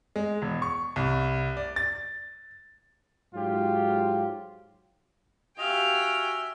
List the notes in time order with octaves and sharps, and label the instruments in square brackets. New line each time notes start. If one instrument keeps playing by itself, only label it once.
[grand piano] G#3
E1
C#6
C2
D5
A6
[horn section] G#2 F#3 F4 G4
[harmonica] F#4 E5 [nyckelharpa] G4 F5 [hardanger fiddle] G5 G#5 [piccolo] F7